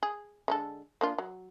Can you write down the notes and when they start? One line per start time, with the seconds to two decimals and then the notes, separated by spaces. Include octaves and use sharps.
0.03 G#4
0.48 D3 G#3 A4
1.01 A#3 D4 F4
1.18 F#3